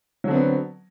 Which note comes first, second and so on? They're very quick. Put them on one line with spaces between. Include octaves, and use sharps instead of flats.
F#3 D3 C4 B3